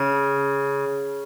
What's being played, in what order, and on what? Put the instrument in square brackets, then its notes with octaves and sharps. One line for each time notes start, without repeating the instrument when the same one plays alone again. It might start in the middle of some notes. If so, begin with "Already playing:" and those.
Already playing: [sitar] C#3